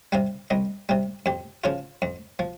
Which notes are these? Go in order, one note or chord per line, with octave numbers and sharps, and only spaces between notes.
C3 G3 F5
C2 D#5
C3 G3
F2 G4
C#3 F3 F4
F2
F3